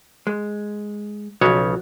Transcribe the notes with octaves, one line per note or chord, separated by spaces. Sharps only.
G#3
B1 C#3 F3 F#3 C#5